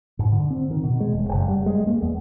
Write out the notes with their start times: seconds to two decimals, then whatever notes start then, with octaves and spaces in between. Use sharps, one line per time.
0.19 G#2
0.32 D3
0.50 C4
0.71 D#3
0.83 B2
1.00 G#3
1.13 E1
1.29 F#1
1.48 G3
1.66 G#3
1.87 A#3
2.02 E2